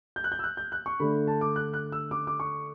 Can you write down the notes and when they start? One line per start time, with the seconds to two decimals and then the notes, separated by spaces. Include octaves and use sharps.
0.16 G6
0.24 F#6
0.32 G6
0.39 E6
0.44 F#6
0.57 G6
0.72 F#6
0.86 C#6
1.00 D3 A3 D4 B5
1.27 A5
1.41 D6
1.56 F#6
1.73 F#6
1.92 E6
2.11 D6
2.27 D6
2.40 C#6